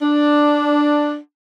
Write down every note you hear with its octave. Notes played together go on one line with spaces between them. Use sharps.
D4